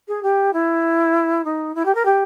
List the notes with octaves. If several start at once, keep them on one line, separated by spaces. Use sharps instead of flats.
G#4
G4
E4
D#4
E4
G4
A#4
G4